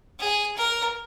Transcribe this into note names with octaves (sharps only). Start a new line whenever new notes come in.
G#4
A#4